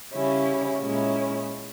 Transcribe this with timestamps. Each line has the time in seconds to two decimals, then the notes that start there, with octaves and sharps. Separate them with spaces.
0.14 C#3 G3 C#4 E4
0.80 A#2 G#3 C#4 E4